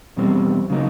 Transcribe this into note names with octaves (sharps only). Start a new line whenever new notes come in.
E2 B2 G3 C4
C#3 F#3 A#3 D#4